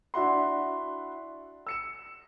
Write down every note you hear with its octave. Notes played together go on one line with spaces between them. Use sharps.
D4 E4 F#4 E5 F#5 C6
E6 C#7 E7